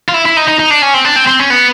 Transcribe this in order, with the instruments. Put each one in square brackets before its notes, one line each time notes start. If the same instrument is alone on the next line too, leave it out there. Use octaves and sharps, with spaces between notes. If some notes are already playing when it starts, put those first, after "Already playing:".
[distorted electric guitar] F4
E4
E4
D#4
D#4
D#4
D4
C#4
C4
D4
C4
C4
C#4
B3